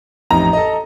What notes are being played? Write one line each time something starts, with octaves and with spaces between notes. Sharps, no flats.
A1 F2 D#4 A#5
A4 D#5